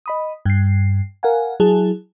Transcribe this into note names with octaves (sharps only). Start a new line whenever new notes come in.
D#5 B5 D#6
G2 C7
A#4 F5 F#5 G#5
F#3 E4 G#4 A5